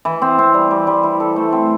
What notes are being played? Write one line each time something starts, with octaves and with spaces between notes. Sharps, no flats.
E3
C4
C4
G3
G3
G3
E4
A4
A3
C4